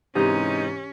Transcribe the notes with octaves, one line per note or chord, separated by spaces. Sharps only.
G#2 C3 E3 C#4 D#4 G4